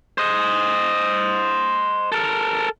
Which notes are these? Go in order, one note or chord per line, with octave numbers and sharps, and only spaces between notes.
C5 D#5
A4 A#4